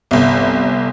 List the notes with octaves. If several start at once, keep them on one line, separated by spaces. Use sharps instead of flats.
G1 C2